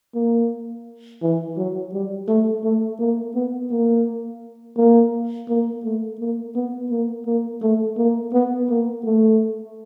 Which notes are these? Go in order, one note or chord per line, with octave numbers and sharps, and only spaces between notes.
A#3
E3
F#3
G3
A3
A3
A#3
B3
A#3
A#3
A#3
A3
A#3
B3
A#3
A#3
A3
A#3
B3
A#3
A3